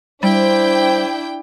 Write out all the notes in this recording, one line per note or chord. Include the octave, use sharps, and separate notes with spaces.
G3 D4 E4 C5 G5